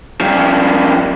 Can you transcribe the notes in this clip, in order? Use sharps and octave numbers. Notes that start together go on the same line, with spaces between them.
G2 F3